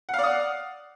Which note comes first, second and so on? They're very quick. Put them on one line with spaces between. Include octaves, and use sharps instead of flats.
F#5 F5 D5 D#6